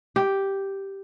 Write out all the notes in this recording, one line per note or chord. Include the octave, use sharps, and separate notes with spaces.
G4